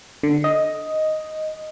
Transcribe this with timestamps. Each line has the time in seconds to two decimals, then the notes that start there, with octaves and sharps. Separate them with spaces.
0.23 D3
0.44 D#5